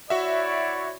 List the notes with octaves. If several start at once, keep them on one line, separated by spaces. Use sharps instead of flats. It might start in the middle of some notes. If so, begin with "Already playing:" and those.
E4 F#4 C#5 D5 E5